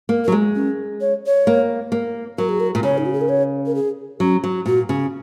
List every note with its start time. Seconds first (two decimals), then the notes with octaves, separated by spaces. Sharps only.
0.09 A#3
0.25 F#3 A#4
0.32 G#3
0.55 C#4
1.01 C#5
1.26 C#5
1.47 A#3
1.92 A#3
2.38 F#3 A#4
2.49 G#4
2.60 A#4
2.75 A#2
2.83 C#3 C#5
2.98 D#4
3.06 F#4
3.14 G#4
3.21 A#4
3.29 C#5
3.66 A#4
3.75 G#4
4.20 F#3 C#4
4.44 F#3
4.66 A#2 F#4
4.89 C#3